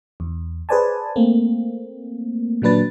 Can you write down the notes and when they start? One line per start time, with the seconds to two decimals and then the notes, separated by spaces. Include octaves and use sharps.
0.20 E2
0.69 G#4 B4 C5 D5 G#5 A5
1.16 A3 A#3 C4
2.62 A#2 D#3 F#3 D4 B4 A6